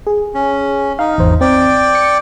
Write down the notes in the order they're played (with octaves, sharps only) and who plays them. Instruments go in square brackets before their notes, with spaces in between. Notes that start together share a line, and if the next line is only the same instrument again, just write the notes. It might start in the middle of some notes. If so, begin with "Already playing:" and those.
[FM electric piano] G#4
[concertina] C#4
[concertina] D#4 [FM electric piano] F5
[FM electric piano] G#1 E2 C5
[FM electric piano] C4 [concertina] D5 G5
[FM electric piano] C#7